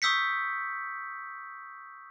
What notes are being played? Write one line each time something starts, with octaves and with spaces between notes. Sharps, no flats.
C#6 D#6 E6 G6 B6 C#7